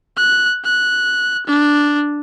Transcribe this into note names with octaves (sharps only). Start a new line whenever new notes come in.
F#6
F#6
D4